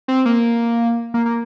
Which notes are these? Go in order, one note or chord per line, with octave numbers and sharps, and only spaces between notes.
C4
A#3
A#3
A#3